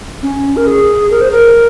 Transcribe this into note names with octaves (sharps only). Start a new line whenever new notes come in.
C#4
A#4
G#4
A#4
C5
A#4